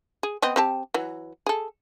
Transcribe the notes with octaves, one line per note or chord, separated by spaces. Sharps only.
G#4
B3 C4 D#5
C4 G4 A5
E3 F#3
G#4 A4